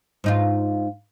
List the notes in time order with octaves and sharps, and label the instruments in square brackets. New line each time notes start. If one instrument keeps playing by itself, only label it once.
[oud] G#2 D#4 F4